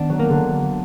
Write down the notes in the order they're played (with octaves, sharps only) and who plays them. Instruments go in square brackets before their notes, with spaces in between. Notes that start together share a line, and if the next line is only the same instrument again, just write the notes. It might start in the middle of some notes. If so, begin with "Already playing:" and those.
Already playing: [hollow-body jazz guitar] D#3 D4 [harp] B3
[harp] F#3
[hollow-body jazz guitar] A#3
[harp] D3